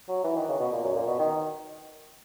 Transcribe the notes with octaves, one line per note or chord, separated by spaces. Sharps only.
F#3
E3
D#3
C#3
B2
A#2
F#2
A#2
B2
D#3